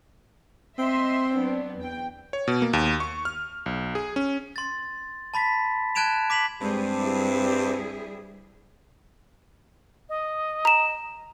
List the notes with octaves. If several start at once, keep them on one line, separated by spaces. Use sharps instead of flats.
C4 D#5 E5 C6
F#3 B3 D4
E2 G5
C#5
B2
A#3
D#2
C#6
F6
B1
G#4
C#4
C6 A6
A5 B5 A6 B6
A5 F#6 G#6 D7 E7 F7
D6 B6 F7 F#7
G2 G3 G#3 C4 G#4
G3 E4 G#4
D#5
A#5 E7